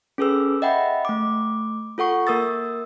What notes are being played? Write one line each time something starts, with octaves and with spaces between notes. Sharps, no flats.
C#4 G#4 A4 B4 E6
D#5 E5 F#5 G5 B5
A3 D6
F4 A4 F#5 C#6
A#3 A#4 D#6 E6 A6